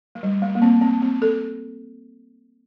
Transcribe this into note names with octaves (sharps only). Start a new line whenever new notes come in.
A3
G3
A3
A#3
C4
C4
C4
A4